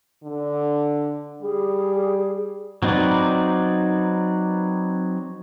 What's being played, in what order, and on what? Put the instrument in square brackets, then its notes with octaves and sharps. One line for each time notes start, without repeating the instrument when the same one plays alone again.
[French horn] D3
[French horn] G3 [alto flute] G#4
[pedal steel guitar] F#3 C4 D#4 B4 D5